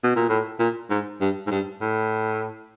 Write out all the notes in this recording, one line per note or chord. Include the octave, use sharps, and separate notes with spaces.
B2
A#2
A2
A#2
G#2
G2
G#2
G2
A2